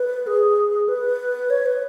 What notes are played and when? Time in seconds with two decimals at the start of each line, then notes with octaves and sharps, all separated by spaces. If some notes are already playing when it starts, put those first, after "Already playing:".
Already playing: B4
0.27 G#4
0.88 B4
1.50 C#5
1.66 B4